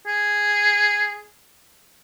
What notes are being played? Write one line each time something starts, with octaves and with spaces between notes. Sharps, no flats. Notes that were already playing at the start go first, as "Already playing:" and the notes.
G#4